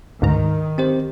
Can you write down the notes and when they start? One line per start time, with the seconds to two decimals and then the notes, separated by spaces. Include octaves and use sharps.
0.22 D2 G#2 D#3 A#5
0.78 C4 G4 C5